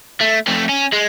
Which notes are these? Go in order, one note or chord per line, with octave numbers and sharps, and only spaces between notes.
A3
F2 A3
C#4
G#3